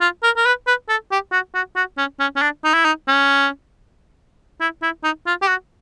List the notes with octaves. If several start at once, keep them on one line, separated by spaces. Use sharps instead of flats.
F4
A#4
A#4
B4
B4
A4
G4
F#4
F#4
F#4
C#4
C#4
C#4
D4
D#4
E4
D#4
C#4
E4
E4
D#4
F4
G4
F#4